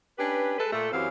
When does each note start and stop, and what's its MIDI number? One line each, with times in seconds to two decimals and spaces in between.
0.18 0.57 61
0.18 0.57 62
0.18 0.57 67
0.18 0.57 71
0.59 0.70 56
0.59 0.70 69
0.59 0.70 71
0.72 0.92 46
0.72 0.92 57
0.72 0.92 69
0.92 1.08 42
0.92 1.08 52
0.92 1.08 54
0.92 1.08 60
0.92 1.08 67
0.92 1.08 77